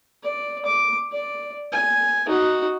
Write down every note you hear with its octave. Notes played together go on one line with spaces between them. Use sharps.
D5
D6
D5
G#5
D#4 F#4